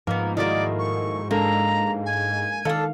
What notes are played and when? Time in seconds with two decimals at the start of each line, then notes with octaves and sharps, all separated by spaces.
0.07 G#2 F3 A#3 B3
0.37 D#3 A3 A#3 E4 F#4 D5
0.78 C#6
1.31 G#3 A#3 D4 A4 A#5
2.05 G#5
2.65 D#3 D4 A4 F5